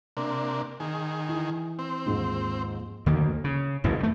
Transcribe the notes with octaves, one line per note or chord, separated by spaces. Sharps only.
C3 A#3 D4
D#3 G#4
E3
C4
D#2 G#2 F3
D2 D#3 A#3
C#3
F#1 F2 G#2 E3
D3 A3